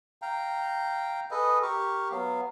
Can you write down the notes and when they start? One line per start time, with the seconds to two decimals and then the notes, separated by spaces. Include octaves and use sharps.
0.22 F5 G5 A#5
1.31 G#4 A4 B4 D#5
1.62 G4 A#4 C#6
2.11 F#3 B3 F5